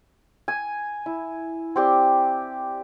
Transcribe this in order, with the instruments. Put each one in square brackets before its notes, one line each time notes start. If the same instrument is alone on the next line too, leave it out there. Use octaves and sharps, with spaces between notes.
[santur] G#5
E4
C4 G4 D5